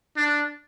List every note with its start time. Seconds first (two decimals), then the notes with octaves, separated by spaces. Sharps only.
0.17 D4